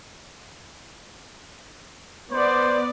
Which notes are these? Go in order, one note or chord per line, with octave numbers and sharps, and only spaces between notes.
B3 C5 D5